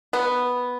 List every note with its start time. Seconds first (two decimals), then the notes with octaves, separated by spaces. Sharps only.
0.13 B3